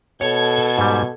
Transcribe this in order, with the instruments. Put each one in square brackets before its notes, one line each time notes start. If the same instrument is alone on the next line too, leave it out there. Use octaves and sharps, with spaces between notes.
[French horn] B2 [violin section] A4 G#6 [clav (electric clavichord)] C#5
[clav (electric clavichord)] G#2 G3